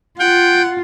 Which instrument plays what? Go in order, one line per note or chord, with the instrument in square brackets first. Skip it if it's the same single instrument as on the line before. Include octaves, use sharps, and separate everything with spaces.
[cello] F4 [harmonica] F#5 [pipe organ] G5